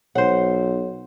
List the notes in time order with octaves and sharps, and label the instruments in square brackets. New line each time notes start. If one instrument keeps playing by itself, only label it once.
[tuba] B1 [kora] C5 F#5 [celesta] C#5